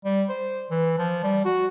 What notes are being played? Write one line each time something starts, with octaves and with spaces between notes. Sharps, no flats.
G3
C5
E3
F3
G3
F#4